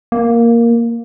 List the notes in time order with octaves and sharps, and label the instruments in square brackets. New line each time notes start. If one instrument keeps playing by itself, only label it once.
[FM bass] A#3